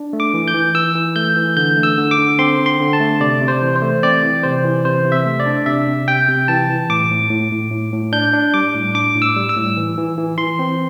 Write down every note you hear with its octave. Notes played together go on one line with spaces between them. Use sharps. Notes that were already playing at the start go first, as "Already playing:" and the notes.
Already playing: D4
A3
D6
E3
G6
E3
E3 E6
E3
A3 G6
E3
D3 G6
A3
E6
D3
D6
D3
C4 C6
D3
C6
D3
A5
A3
C3 D5
C3
C5
E3
C5
A3
C4 D5
E3
C3 C5
E3
C3 C5
C3
E5
A3
D5
D4
C3 E5
C3
C3 G5
C3
E3 A5
E3
A2 D6
A2
A2
A2
A2
A2
D4 G6
D4
G3 D6
A2
D4 D6
A2
E6
G3
E6
A2
E3
E3
E3
E3 C6
C4